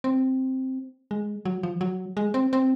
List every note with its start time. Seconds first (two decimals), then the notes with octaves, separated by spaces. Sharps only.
0.04 C4
1.11 G#3
1.45 F#3
1.63 F3
1.81 F#3
2.17 G#3
2.34 C4
2.53 C4